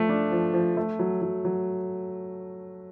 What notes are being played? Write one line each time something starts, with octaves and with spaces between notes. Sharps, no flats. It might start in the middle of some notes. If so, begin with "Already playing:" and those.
Already playing: F3 A3
D4
F3
F3
A3
F#3
F#3
F#3